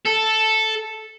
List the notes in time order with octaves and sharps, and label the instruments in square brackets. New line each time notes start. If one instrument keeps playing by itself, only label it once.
[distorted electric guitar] A4